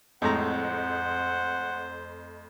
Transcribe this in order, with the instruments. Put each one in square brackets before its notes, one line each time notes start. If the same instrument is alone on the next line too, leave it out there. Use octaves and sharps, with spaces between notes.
[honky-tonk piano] F2 A3 [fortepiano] A2 G#3 A#5 [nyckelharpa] C5 [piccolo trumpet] F#5